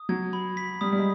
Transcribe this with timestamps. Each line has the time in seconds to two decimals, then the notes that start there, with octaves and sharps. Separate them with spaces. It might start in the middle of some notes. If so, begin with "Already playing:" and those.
Already playing: D#6
0.09 F#3 G#6
0.33 B5
0.57 B6
0.81 G3 D#6
0.92 G3
0.99 G#3